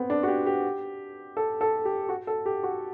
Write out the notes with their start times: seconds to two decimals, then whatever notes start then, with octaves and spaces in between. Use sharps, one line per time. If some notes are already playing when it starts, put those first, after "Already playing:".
Already playing: B3 C4
0.10 D4
0.23 F#4
0.28 G4
0.46 G4
1.37 A4
1.61 A4
1.85 G4
2.09 F#4
2.27 A4
2.46 G4
2.63 F#4